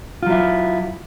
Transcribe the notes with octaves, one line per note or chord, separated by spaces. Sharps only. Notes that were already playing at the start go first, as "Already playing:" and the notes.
F#3 E4 F4